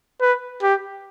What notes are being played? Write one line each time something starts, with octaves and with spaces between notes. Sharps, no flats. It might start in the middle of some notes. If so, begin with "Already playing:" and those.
B4
G4